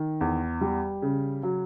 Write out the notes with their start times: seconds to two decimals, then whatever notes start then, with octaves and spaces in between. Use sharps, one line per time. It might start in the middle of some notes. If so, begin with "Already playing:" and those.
Already playing: D#3
0.21 E2
0.61 G3
1.02 C#3
1.43 F#3